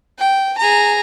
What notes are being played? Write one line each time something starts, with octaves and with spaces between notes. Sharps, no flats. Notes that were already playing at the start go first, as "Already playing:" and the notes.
G5
G#4 A#5